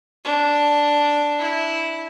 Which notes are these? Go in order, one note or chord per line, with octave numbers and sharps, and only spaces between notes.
D4
E4